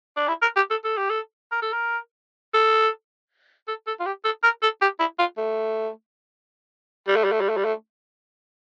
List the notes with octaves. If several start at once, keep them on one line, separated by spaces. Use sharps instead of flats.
D4
E4
A#4
G4
A4
A4
G4
A4
A#4
A4
A#4
A4
A4
A4
F4
G4
A4
A#4
A4
G4
E4
F4
A3
G3
A3
G3
A3
G3
A3
G3
A3